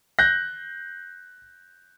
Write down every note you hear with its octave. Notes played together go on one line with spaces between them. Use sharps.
F#6 G6 A#6